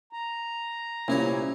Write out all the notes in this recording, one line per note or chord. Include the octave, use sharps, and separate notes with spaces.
A#5
C2 A#2 C#4 E4 C#5